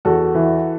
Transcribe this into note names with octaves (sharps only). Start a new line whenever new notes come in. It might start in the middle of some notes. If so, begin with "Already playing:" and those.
E2 F#4 A4
E3